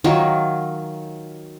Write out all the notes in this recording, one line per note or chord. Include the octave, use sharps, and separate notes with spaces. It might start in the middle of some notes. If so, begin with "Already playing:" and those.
D#3 F#3 F4